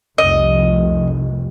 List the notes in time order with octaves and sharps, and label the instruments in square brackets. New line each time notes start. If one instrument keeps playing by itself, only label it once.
[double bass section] F1 C2 F2 [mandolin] D#5